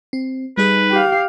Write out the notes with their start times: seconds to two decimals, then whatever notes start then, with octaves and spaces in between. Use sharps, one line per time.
0.13 C4
0.57 G3 D#4 G#4 B4
0.91 G4 F5